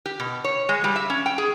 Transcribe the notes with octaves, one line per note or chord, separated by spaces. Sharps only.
G4
B2
C#5
G#3
G3
E5
C#4
G5
G#4